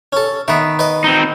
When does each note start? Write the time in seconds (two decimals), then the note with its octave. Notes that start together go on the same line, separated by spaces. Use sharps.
0.13 C#4 A4
0.48 D#3 B3 E5
0.79 B4 D#5
1.04 C4 D#4